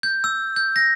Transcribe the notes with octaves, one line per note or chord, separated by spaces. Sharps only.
G6
E6
G6
A#6